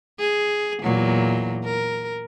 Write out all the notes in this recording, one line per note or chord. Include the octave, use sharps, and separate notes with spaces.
G#4
E2 A#2 F#3
A#4